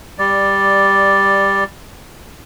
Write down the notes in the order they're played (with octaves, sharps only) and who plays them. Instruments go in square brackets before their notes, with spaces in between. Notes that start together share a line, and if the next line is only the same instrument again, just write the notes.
[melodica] G3 D5